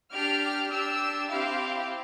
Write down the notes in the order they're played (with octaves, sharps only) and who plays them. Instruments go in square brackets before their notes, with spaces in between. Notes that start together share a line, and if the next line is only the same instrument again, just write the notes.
[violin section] D4 G4 F6
D4 G4 E6
C4 E4 G4 F5